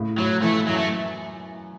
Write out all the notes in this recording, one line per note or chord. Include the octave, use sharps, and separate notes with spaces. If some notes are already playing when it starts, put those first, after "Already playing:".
Already playing: A2 C#3
A2 F#3
E3 A3
F#2 F#3
A3